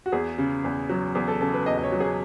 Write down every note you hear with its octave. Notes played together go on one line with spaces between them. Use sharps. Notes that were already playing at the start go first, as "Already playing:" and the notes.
F#4
E2 G#4
C#3
E2
F#3
E2 G#4
A4
C#3 A4
B4
E2 D#5
D#5
C#5
F#3
G#4